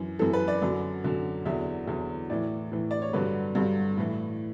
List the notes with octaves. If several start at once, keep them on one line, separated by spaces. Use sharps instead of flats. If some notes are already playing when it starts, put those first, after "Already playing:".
Already playing: F#2 E3
F#2 E3 A4
B4
D5
F#2 D3 F#3
F#2 D3 F#3
E2 D3 F#3 E5
E2 D3 F#3
A2 E3 D5
A2 E3
D5
C#5
G2 D3 F#3 B4
G2 D3 F#3
A2 E3